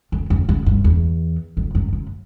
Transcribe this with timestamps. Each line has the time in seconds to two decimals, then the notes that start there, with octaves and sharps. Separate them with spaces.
0.12 F2
0.30 F2
0.49 F#2
0.66 G2
0.84 E2
1.57 F2
1.75 F#2
1.93 F#2